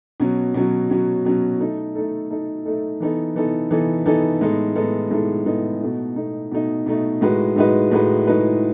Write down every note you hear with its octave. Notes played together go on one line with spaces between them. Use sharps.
B2 F#3 C#4
B2 F#3 C#4
B2 F#3 C#4
B2 F#3 C#4
A3 D#4 A4
A3 D#4 A4
A3 D#4 A4
A3 D#4 A4
E3 B3 D#4 A4
E3 B3 D#4 A4
E3 B3 D#4 A4
E3 B3 D#4 A4
A2 G#3 B3 D#4 A4
A2 G#3 B3 D#4 A4
A2 G#3 B3 D#4 A4
A2 G#3 B3 D#4 A4
B2 A3 D#4
B2 A3 D#4
B2 A3 D#4
B2 A3 D#4
A2 G#3 D#4 F#4 B4
A2 G#3 D#4 F#4 B4
A2 G#3 D#4 F#4 B4
A2 G#3 D#4 F#4 B4